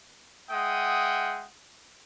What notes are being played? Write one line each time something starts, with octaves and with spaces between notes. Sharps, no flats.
G#3 E5 F#5 G5 D#6